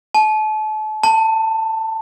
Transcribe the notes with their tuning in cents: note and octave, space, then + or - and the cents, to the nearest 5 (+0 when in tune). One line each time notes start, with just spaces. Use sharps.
A5 -35
A5 +15